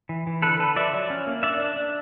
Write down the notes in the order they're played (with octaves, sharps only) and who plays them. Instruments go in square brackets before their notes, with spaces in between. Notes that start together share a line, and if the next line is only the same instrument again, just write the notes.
[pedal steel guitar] E3
E3
D3 A4 B4
D3 A4 B4
F3 D5 E5
F#3
C#4
A#3
D4 D5 E5
D4
D4